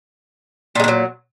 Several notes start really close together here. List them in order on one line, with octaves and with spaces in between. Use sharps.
A#2 G#3 D3 F#3